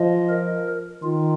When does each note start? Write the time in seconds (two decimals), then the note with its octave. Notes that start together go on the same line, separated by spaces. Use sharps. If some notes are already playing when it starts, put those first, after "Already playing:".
Already playing: F3 D#5
0.29 A#4
1.03 D#3 F4